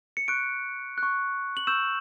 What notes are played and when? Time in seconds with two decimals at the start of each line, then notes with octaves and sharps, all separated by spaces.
0.17 C#7
0.28 C#6 F#6 D7
0.98 F#6
1.03 C#6
1.57 F#7
1.67 C#6 E6 G6 E7